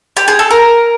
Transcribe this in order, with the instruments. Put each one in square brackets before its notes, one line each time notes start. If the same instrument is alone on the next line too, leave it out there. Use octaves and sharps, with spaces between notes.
[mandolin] G4
G#4
A4
A#4